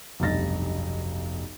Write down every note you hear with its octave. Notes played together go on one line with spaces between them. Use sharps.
F1 B1 G2 A6 A#6